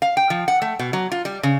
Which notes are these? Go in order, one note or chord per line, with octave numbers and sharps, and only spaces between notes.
F5
G5
F3
F#5
A3
B2
F#3
F4
G3
C#3